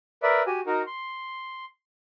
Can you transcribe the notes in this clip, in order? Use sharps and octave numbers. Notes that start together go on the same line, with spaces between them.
A#4 B4 D5 E5
F#4 G4 G#5
D#4 F#4 A#4
C6